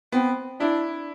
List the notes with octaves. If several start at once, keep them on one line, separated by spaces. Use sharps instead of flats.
B3 C4
D4 E4